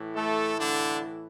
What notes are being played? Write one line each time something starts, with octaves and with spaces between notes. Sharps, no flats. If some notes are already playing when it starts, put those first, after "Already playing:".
Already playing: A2 E3
A3 A4
D3 D4